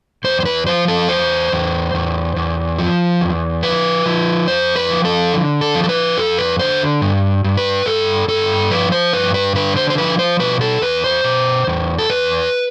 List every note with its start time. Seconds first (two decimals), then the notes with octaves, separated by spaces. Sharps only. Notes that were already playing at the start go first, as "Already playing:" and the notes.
0.24 E2 C5
0.40 C5
0.46 B4
0.67 F3 C5
0.88 A4
1.09 E2 C5
1.52 E2
1.94 E2
2.36 E2
2.79 F3
3.21 E2
3.63 F3 B4
4.06 F3
4.48 F2 C5
4.76 B4
4.91 F3
5.05 A4
5.33 D3
5.61 A4
5.75 F3
5.84 A4
5.89 B4
6.17 F2 A4
6.38 B4
6.59 D3 C5
7.02 G2
7.44 G2
7.57 B4
7.86 G2 A4
8.28 G2 A4
8.71 F3 B4
8.92 C5
9.13 G2 B4
9.34 B4
9.55 D3 B4
9.77 C5
9.90 C5
9.98 F3 B4
10.19 C5
10.39 B2 B4
10.61 A4
10.82 E2 B4
11.04 C5
11.24 B2
11.67 E2
11.99 A4
12.10 E2 B4